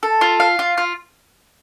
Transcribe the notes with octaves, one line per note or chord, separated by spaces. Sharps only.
A4
F4
F5
F4
F4